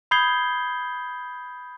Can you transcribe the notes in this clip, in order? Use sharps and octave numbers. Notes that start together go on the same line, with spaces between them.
B5 D#6 G6 G#6 C7 G7